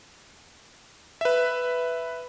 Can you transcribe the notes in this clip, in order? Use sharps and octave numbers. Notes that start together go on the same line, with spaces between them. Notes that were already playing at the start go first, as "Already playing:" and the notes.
B4 E5